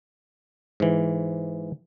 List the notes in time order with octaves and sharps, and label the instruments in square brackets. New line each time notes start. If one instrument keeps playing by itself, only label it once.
[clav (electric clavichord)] G#2 E3